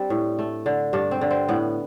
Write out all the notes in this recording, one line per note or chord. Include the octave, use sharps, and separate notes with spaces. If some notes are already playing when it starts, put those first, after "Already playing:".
Already playing: G3 C4 D4
A2
A3
D3
G2 D4
C4
D3
C4
A2 B3